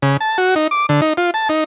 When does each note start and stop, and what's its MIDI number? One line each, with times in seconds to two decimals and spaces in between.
0.02 0.17 49
0.21 0.38 81
0.38 0.55 66
0.56 0.67 63
0.71 0.86 86
0.89 1.01 50
1.02 1.13 63
1.17 1.31 65
1.34 1.48 81
1.49 1.64 63